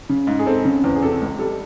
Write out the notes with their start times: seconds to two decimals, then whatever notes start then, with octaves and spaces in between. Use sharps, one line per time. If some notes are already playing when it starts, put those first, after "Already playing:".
0.09 C#3
0.27 G#2
0.39 G#4
0.46 C4 A4
0.65 C#3
0.84 E2
0.96 G#4
1.02 C3 A4
1.21 C#2
1.39 G3 A4